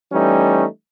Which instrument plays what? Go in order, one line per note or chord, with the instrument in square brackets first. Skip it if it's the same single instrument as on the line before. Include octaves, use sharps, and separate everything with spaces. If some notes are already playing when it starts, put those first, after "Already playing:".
[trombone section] E3 G3 A3 C#4 D#4